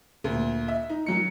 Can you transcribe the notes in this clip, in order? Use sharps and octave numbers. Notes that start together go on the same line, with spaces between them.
D2 A#2
E5
D#4
D#3 F#3 C#7